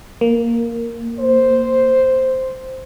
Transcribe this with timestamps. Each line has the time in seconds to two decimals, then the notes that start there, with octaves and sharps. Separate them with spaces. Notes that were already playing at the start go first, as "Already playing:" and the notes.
0.21 A#3
1.20 C5